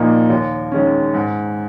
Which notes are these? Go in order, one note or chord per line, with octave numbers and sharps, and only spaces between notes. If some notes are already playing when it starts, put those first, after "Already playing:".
Already playing: A#1 A#2 F3 A#3 D#4
D#2
D#3 G#3 C#4
G#2